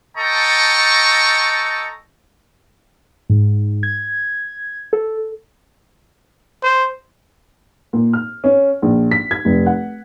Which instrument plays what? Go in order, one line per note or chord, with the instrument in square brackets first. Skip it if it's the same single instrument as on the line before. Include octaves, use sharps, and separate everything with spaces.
[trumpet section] A4 D#5 G5 A5 A#5 C#6
[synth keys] G#2
G#6
A4
[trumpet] C5
[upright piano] A#2
F6
C#4
A#1
B6
G#6
F1
F#5